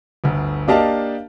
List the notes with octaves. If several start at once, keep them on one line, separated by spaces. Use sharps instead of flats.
G1 D2
A#3 D4 G4 D#5 F5 A5